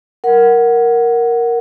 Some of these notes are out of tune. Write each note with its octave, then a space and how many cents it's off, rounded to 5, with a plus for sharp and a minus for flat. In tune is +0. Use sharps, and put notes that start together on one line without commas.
A#4 +0 F#5 +0